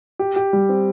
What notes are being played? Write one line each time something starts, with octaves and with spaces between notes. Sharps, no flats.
G4
G4
G3
C4